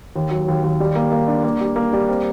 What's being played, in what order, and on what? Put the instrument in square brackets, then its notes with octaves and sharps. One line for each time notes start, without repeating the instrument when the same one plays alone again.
[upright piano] D#2
F#3
D#2
D#2
G3
A#3
A#3
D4
A#3
G3
A#3
G3
C4